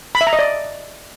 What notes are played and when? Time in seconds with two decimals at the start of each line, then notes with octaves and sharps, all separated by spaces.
0.15 B5
0.21 E5
0.27 A#5
0.33 D#5
0.39 D5